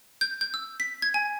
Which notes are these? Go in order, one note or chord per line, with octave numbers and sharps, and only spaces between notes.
G6
G6
E6
B6
G#6
G#5